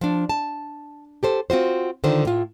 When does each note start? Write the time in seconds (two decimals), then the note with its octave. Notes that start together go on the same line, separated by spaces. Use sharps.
0.01 F3 D4
0.29 A5
1.23 G4 A4 C5
1.50 C4 F4 F#4 C5
2.04 D3 D#3 F4 C5
2.25 A2 F4